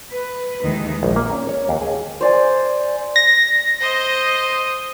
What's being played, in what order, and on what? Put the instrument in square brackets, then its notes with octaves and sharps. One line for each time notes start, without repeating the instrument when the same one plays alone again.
[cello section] B4
D#2 D#3 E3 G#3
[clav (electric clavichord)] A#1
A#3
C#4
C#5
D#2
G#4
[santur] C5 D5 G#5
[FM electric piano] A#6
[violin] C5 D#5